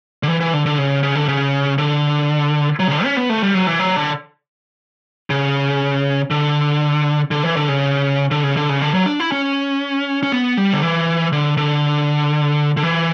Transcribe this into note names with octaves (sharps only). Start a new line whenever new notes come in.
D3
E3
E3
D3
D3
C#3
C#3
D3
C#3
D3
F#3
C#3
D3
C#4
B3
A3
G3
F#3
E3
F#3
D3
C#3
D3
D3
E3
D3
C#3
D3
C#3
D3
C#3
D3
F#3
D4
E4
C#4
C#4
B3
G3
D3
E3
D3
D3
D3
E3